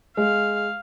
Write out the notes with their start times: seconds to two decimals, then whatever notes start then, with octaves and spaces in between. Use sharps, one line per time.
0.17 G#3 F5